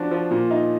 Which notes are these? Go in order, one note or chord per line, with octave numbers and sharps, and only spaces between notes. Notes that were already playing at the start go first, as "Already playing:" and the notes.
Already playing: F3 D4 F#4
F3
A#2
D#4